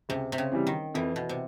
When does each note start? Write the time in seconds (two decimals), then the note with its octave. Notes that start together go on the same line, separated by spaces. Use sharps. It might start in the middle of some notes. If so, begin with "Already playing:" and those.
0.09 C#2 C3
0.32 C3
0.38 C#3
0.52 C3 E3 G3
0.67 D#3
0.94 F2 E3
1.16 B2
1.29 C3